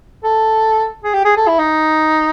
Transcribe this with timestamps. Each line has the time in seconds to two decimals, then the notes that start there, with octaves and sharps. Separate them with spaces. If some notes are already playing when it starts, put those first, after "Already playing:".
0.24 A4
1.04 G#4
1.14 G4
1.25 G#4
1.37 A4
1.48 E4
1.59 D#4